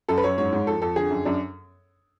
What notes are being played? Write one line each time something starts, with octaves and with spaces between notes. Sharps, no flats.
F#2 A4
B4
F#2 C#5
G#2 C#5
G#2
F2 A4
F2 A4
D3 G#4
F#2
F#2 D4